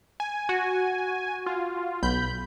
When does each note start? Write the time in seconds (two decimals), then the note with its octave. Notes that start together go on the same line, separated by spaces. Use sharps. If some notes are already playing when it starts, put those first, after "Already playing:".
0.20 G#5
0.49 F#4
1.46 F4
2.03 B1 B5 G6